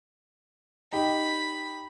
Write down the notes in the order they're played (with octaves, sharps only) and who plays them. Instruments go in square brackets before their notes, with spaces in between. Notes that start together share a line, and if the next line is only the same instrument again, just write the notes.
[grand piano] D#4 G4 G5 [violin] B5